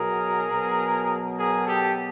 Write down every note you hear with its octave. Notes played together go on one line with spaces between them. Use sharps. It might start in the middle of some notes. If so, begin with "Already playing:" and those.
Already playing: B2 F#3 G#4 A#4
B2 F#3
G#4 A#4
G4 A4